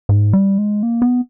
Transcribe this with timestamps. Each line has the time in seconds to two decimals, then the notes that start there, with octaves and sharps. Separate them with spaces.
0.09 G#2
0.33 G3
0.58 G#3
0.83 A#3
1.02 B3